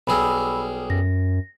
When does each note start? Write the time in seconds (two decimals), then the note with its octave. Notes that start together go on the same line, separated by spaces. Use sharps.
0.07 B1 G3 G#4 B5 E6
0.90 F#2 A#6